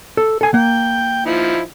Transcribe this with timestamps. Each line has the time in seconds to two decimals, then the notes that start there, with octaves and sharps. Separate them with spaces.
0.17 A4
0.41 A4 G#5
0.54 A#3 G5
1.25 F3 D#4 E4